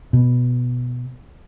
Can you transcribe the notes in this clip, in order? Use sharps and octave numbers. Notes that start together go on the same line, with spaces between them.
B2